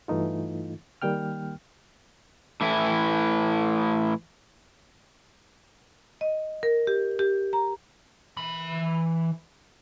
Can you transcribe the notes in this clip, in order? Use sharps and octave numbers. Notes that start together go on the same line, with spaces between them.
G2 E3 A3 D#4 F4
D#3 G3 A#3 G5 F6
A2 E3 E4
D#5
A#4
G4
G4
A#5
E3 B5